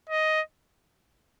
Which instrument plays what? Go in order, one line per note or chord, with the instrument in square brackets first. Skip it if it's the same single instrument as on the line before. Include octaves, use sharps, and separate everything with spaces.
[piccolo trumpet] D#5